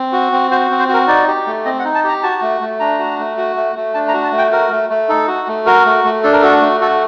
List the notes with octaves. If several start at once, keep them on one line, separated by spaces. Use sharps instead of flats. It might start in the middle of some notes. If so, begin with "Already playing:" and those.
Already playing: C4
F#4
C4
F#4 C5
C4
C5
F#4 A#4
D#4 D5
G4
A3
C4 D#5
F#5
D#4
A5
G4 A#5
F#4 A5
A3
A3
D4 A#5
F#4
A3
F#4
A3
A3
D4 A5
A#5
F#4
A5
A3
G5
F#4 A#4
A3
A3
D#4 A4
F#4
A3
F#4 A#4
A3
A3
D4 A4
A#4
F#4 A4
A3
F#4 A4